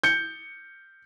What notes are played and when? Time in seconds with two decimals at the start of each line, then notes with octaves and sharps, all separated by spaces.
0.03 G6 C#7